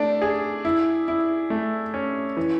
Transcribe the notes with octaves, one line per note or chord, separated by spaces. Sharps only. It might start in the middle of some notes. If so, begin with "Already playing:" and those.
Already playing: A3 D4
G#4
E4
E4
A3
C#4
E3